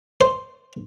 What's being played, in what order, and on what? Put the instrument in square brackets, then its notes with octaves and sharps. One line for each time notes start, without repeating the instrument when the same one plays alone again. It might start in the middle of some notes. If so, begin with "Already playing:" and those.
[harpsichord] C5